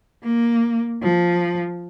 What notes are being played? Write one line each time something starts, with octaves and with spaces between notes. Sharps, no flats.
A#3
F3